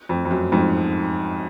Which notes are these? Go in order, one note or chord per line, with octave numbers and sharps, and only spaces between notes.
F2
F2
F#2
F2 G#2